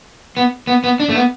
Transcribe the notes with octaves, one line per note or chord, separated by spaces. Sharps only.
B3
B3
B3
D4
A3
B3